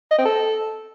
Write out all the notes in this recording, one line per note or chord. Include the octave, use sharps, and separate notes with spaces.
D#5
C4
A4